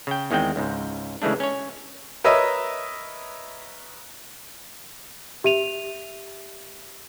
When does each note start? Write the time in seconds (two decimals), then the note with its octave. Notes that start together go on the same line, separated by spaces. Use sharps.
0.07 C#3 G5
0.31 E2 D#3 G#3 C4 G5
0.56 C#2 G#2
1.22 C#3 E3 G#3 A3 D4
1.40 C#4 C#5
2.24 A#4 B4 C#5 D#5 E5 E6
5.44 G4 E5 D#7 F7